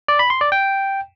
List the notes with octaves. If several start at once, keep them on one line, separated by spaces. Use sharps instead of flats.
D5
B5
C6
D5
G5